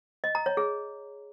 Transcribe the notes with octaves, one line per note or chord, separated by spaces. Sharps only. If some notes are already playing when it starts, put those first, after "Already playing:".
D#5
A#5
C#5
G#4